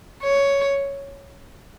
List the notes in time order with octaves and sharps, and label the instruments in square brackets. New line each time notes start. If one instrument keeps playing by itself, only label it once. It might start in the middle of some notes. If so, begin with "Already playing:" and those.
[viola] C#5